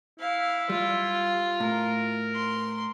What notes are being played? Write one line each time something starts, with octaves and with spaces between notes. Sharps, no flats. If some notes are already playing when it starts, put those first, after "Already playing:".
E4 F5
G3 F4
A2 A#4
C6